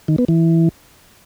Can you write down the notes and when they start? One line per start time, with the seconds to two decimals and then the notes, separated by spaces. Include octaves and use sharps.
0.08 D#3
0.18 B3
0.28 E3